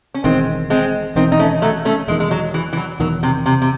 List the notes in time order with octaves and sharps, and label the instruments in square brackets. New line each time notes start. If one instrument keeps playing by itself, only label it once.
[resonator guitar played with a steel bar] C#4
[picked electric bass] E1 E2 D#3 [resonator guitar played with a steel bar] G#3 C4
[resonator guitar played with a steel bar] G#3 C4
[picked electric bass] E1 E2 D#3 [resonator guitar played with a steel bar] C4 D#4
[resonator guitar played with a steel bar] D#4
A3 C#4
F#3 A3
A3 C#4
[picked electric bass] E1 E2 D#3 [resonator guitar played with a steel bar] G#3
[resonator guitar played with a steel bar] G#3
F#3
E3
E3
F#3
[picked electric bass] E1 E2 D#3 [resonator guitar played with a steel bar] F#3
[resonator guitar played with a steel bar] C3
C3
C3